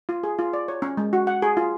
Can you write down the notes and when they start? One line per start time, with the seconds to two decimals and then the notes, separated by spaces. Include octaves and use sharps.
0.09 F4
0.24 G#4
0.39 F4
0.53 D5
0.68 C#5
0.82 C#4
0.97 G#3
1.13 F#4
1.27 F#5
1.42 G#4
1.57 F4